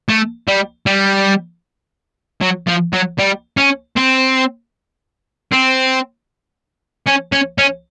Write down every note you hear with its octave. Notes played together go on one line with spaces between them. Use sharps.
A3
G3
G3
F#3
F3
F#3
G3
C#4
C4
C4
C#4
C#4
C#4